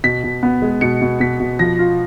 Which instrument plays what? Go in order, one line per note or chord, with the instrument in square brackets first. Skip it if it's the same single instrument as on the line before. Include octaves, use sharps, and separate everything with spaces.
[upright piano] B2 B6
B2
B3
G#3
B2 C#7
B2
B2 B6
B2
F3 A#6
F4